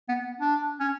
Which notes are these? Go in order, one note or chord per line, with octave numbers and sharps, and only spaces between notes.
B3
D4
C#4